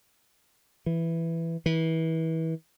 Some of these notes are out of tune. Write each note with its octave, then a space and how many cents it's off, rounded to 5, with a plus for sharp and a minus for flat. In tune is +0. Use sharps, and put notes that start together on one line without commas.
E3 +5
E3 -30